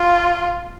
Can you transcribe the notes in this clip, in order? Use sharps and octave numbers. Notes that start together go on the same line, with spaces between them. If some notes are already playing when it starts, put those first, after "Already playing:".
Already playing: F4